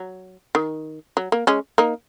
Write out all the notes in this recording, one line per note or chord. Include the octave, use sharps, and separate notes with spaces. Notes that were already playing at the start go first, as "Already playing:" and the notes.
Already playing: F#3
D#3
F#3
A#3
G#3 C#4
A#3 D#4